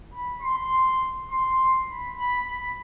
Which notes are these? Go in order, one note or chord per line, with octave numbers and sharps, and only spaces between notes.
B5
C6
C6
B5
B5
B5